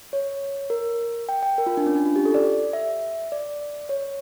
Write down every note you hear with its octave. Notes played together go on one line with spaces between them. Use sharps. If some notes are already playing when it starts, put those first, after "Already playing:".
C#5
A#4
G5
G5
A#4
F4
D4
C#4
D4
F4
G4
A4
D5
E5
D5
C#5